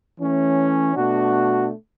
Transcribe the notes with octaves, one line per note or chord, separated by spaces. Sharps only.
E3 A3 C#4
B2 A3 D4 F#4